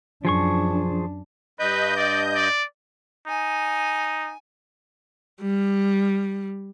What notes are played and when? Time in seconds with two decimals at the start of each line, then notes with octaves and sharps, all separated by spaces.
0.25 F#2 F3 D4 G#4 C#6
1.60 G2 B4 D#5 G6
1.96 D5
2.33 D5
3.27 D#4 G#5
5.41 G3